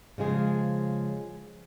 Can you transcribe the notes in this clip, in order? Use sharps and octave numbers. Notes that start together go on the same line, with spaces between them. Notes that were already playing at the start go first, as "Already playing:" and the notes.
C#3 F3 G#3 G#4